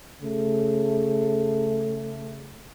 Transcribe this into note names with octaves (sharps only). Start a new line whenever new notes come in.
C#3 A3